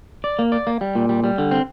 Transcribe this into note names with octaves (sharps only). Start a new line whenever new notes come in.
D5
A#3
D5
A#3
G3
A#2
G3
G3
D3
C4